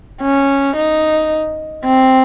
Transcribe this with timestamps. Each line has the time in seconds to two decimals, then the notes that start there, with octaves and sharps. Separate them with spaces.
0.21 C#4
0.77 D#4
1.85 C4